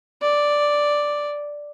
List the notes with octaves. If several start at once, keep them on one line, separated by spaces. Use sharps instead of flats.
D5